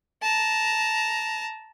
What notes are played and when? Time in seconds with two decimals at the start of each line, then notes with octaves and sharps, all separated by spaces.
0.23 A5 A#5